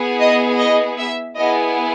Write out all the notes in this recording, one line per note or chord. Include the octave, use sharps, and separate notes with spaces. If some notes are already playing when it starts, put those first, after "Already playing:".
Already playing: B3 E4 G#4
D#5
D#5
E5
B3 E4 G#4 D#5